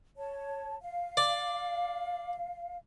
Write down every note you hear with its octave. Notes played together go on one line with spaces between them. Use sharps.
C#5 A5
F5
D5